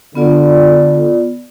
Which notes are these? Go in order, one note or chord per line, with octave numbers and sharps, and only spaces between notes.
D3 B3 F4 D5